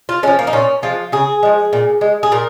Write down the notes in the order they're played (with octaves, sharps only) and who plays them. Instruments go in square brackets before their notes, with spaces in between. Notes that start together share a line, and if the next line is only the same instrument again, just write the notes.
[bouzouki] F4
F3 G#3 C#4
A#3
D#4
A#2 C#4
F3 G#3 F4
C#3 G#4
F3 G#3
A#2
G#3
G#4
A#2 A#4